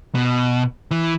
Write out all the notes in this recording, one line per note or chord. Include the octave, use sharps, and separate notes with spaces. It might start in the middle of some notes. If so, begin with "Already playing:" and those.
B2
E3